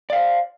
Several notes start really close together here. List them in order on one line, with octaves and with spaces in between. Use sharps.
D5 F5 C5